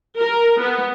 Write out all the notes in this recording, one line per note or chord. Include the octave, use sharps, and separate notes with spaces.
A#4
B3